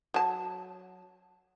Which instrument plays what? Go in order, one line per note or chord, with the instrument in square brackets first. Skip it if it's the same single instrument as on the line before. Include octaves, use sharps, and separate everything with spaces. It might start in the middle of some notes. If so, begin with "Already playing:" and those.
[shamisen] F#3 A5